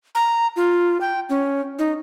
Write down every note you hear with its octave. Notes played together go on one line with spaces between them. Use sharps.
A#5
F4
G5
C#4
D#4